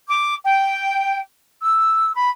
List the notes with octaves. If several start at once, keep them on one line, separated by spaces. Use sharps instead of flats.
D6
G5
E6
B5